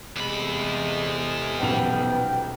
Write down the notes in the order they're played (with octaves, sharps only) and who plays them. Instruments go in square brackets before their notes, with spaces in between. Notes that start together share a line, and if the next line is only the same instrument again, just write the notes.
[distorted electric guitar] E2 B5 [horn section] C3 G#3 A3
[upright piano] D#1 B1 F7 [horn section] B3 [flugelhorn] G5